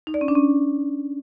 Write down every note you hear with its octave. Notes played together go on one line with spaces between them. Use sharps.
D#4
D5
C#4
D4
C#4